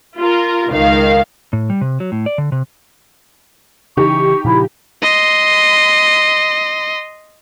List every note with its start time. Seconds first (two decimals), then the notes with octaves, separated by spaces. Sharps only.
0.17 F4 A#4
0.70 C#2 D#3 F5
1.53 A2
1.70 G3
1.81 C3
2.00 F#3
2.12 A2
2.26 D5
2.38 D3
2.52 C3
3.97 C#3 E3 D#4 G4 C#6
4.45 A#2 C#3 F3 E4
5.02 D#5 C6